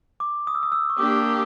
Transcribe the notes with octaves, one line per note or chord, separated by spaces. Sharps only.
D6
D#6
E6
D#6
E6
C#6
A#3 D4 G4 D6